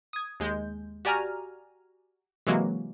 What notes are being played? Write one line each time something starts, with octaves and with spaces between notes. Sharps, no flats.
D#6 G#6
D#2 G#3 G6
F#4 G4 D5 G#5 A#5 F6
C3 E3 F#3 G#3 A#3 F#4